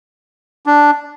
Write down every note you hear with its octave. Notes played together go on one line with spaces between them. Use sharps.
D4